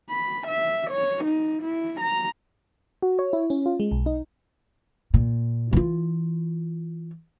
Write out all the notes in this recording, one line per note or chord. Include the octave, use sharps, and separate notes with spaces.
B5
E5
C#5
D#4
E4
A#5
F#4
C#5
E4
C#4
F4
G#3
B1
D#4
A#2
E3 F4